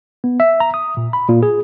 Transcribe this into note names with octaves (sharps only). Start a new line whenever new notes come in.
B3
E5
A#5
D#6
A#2
B5
A#2
G#4